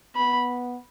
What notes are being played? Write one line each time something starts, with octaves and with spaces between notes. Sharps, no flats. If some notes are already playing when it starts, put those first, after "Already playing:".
B3 B5